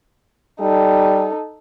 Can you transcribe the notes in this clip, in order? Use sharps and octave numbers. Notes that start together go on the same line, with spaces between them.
G3 D#4 A4